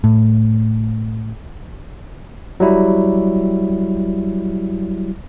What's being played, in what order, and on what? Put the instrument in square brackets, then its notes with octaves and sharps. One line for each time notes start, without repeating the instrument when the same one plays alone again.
[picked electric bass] A2
[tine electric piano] F#3 G3 E4